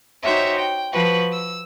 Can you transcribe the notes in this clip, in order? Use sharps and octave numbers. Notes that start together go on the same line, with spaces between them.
D#4 F#4 G4 C5 C#5 E5
G5
F3 F#4 B4
E6